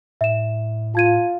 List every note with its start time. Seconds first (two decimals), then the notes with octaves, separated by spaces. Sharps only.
0.21 A2 E5 E7
0.95 F4 A5 G#6 D#7